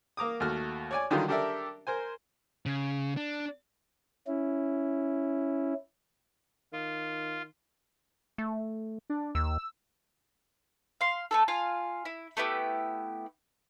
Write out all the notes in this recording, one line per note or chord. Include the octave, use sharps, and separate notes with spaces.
A#3 A#5 D6 D#6
D#2 A3 F#4 F6
C#5 D5 G#5
D3 D#3 F#3 G3 D#4 F4
D4 G4 A4 A#4 D5 E5
A#4 C5 G#5
C#3
D4
C#4 E4
D#3 F4
A3
D4
D#2 E6
F5 C6
A3 C#4 A4
F4 F5 G#5
E4
A3 B3 E4 G4